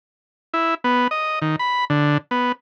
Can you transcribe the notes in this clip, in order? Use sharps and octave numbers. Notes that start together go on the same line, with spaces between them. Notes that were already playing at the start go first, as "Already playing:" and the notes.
E4
B3
D#5
D#3
B5
D3
B3